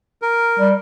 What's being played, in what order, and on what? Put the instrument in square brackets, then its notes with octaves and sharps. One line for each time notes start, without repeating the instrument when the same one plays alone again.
[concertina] A#4
[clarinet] G3